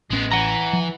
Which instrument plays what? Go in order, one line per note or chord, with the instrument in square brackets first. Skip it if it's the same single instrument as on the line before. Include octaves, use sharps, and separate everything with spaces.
[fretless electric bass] A1 C#4 [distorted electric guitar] G#3 B3
[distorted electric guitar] E3 [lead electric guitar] F#5 A#5
[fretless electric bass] F3